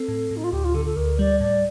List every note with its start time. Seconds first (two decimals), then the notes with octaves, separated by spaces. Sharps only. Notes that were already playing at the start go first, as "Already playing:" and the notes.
Already playing: C4 A4
0.08 A2
0.31 A2
0.36 D#4
0.44 F4
0.52 D2 G4
0.64 F4
0.74 D3 A4
0.85 A4
0.96 D2 A#4
1.19 G3 D5
1.40 A2 D5